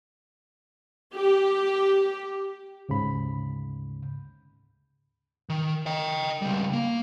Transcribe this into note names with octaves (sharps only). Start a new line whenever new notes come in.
G4
D2 G#2 C#3 B5
D#3
D#5 G5
C#2 G3
A#3